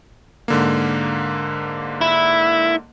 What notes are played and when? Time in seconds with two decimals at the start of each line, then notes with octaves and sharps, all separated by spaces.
0.48 G#2 D3 A#3
2.01 E4